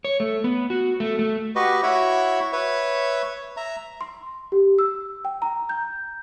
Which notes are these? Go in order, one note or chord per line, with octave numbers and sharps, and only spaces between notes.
C#5
A3
B3
F#4
A3
A3
F#4 G4 B4 D#5
E4 F#4 C#5 E5 B5
B4 C#5 E5
E5 A#5
C6
G4
E6
G5
A#5
G6